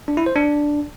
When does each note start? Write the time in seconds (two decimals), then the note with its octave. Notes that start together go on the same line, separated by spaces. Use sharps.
0.08 D4
0.17 E4
0.26 C5
0.36 D4